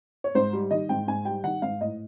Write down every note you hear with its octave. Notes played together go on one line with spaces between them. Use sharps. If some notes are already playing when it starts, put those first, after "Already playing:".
C#5
G#2 C5
G3
D#3 D#5
G#2 G5
G#2 G#5
G3 G5
D#3 F#5
G#2 F5
A2 D#5